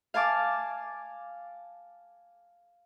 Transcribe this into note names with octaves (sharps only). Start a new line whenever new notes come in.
F5 G#5 A5 D6